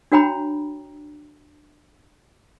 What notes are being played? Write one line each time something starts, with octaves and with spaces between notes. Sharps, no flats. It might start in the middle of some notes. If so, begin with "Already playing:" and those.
D4 F#4 C#5 G5 A#5 B5